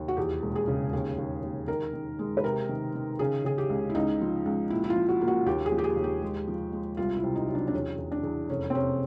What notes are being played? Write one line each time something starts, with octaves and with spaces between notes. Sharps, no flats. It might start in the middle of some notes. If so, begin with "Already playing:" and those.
Already playing: D#2
F#4
E2 G4
E1
G#4
C#3
D#2 G#4
D#2
D#2
D#3 A#4
D#3
G#3
B4
C3 A#4
D#3
D#3
C#3 G#4
C#3 G#4
G4
C#2
E4
C#2 D#4
F3
C#2
A#2 E4
E4
F4
F3
F#4
A#3
F#4
D#2 G4
G#4
F3
G4
G#4
D#2
G4
G#3
F3
G#3
C2 F4
E4
C3
D#4
F#3
D4
D4
E2 C#4
E2
D4
E2
F1 C#4
C4
C3 C#4